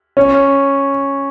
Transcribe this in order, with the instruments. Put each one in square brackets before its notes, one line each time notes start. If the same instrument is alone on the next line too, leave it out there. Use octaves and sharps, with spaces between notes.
[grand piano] C#4